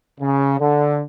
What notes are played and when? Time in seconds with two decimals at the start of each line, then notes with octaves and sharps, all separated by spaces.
0.21 C#3
0.60 D3